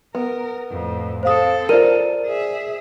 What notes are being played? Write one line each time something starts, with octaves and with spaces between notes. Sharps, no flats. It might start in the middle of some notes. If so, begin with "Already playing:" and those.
B3 A#4
F2 A2
C4 A4 C5 F5 D#6
F4 A#4 C5 D5 D#7
G#4 E5